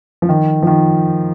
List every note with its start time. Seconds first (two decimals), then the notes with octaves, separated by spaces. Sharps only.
0.22 F3
0.29 D#3
0.63 F3
0.67 D#3